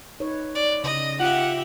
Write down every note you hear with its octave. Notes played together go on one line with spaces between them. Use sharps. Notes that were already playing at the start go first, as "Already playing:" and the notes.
D#4 B4 C#5
D5
C#3 D#5
F4 G4 E5 F#5